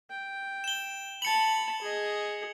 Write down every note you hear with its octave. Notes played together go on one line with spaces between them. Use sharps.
G5
E7 G7
A5 B5 C#7 F7 F#7
G#4 D#5